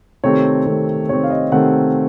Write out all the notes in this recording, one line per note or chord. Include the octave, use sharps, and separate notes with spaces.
C3 D#3 A3 C4 C#5
C3 D#3 A3 C4
C3 D#3 A3 C4 C#5
F5
D#5
C3 D#3 A3 C4 F#5